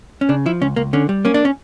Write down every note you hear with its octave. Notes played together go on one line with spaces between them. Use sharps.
C#4
C#3 D4
F3 E4
C#2 C#4
C#2 A#3
D3 C#4
G3
A#3 C#4
D4
C#4